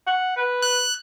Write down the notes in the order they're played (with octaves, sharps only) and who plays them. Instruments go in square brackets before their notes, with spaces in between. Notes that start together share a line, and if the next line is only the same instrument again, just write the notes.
[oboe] F#5
B4
[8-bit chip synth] F#6